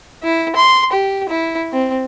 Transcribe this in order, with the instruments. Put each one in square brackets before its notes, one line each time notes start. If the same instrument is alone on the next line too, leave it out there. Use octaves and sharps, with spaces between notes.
[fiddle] E4
C6
G4
E4
C4